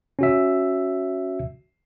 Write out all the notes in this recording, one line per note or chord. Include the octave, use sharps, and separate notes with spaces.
C#4 F#4 E5